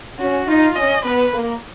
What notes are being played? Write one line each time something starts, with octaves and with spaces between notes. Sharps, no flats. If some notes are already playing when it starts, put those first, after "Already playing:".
C#4 F#4
D#4 F4
C#4 D#5
B3 B4
A#3